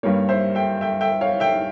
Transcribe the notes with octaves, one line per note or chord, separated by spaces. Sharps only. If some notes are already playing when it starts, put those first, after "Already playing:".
G2 G3 A#3 C#5
C5 E5
E5 G5
E5 G5
E5 G5
C#5 F5
E5 G5